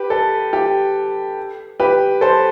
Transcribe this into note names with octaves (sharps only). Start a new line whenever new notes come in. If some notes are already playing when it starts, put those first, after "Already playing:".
Already playing: G4 B4
A4
G4
G4 B4
A4 C5